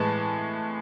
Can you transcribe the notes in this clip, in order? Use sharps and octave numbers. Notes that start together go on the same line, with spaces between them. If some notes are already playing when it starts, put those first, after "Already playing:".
Already playing: A2 E3 G#3 A5